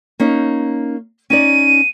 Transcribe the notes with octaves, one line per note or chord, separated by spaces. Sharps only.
A#3 C#4 D#4
C#4 D#4 D5 D#7